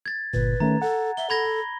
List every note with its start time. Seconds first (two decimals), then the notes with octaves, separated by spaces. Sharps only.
0.06 G#6 A6
0.34 G1 A#2 B4
0.60 D#3 A3 C#4 A#5
0.82 A4 F#5
1.17 E5 G7
1.30 A4 B5 G#6 A#6